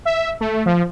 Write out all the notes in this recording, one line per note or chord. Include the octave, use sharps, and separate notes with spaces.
E5
A3
F3